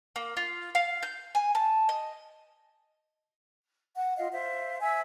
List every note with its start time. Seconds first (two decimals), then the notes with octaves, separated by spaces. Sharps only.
0.16 A#3
0.37 F4
0.75 F5
1.03 G6
1.35 G#5
1.55 A5
1.89 D#5
3.95 F#5
4.17 F4 D#5 F5
4.31 C5 E5 F5
4.81 E5 G#5 E6